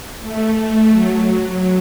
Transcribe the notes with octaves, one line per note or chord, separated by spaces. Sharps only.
A3
F#3